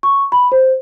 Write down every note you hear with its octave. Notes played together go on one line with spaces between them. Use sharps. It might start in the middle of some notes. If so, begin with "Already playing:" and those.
C#6
B5
C5